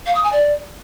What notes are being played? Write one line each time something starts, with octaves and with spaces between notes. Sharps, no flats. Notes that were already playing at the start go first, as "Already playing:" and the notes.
F5
D#6
G#5
D5